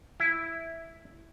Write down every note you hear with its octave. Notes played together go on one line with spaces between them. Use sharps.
E4